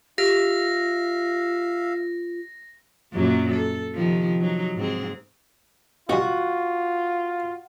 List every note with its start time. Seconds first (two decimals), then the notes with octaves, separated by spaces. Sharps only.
0.18 F4 G4 E5 F5 A#6
3.13 F#2 A#2 F#3
3.52 A4
3.95 C3 D#3 F3
4.40 F#3 D#4
4.76 G#2 C4 G#4
6.09 B2 E3 G3 F4 F#4